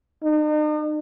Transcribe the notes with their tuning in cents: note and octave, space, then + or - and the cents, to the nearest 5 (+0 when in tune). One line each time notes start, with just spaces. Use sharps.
D#4 -45